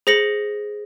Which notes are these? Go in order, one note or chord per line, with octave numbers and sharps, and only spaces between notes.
G#4 C5 A#6 C#7 F#7